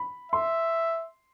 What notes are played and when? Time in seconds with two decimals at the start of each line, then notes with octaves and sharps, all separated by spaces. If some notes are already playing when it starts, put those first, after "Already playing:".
Already playing: B5
0.32 E5 C6